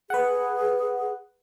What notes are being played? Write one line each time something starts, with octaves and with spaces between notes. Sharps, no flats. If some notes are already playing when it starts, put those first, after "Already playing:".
G#4 B4 F#5